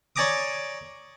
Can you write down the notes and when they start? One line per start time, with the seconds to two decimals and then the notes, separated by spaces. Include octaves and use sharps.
0.16 C#5 D5 G#5 A#5 D6 D#6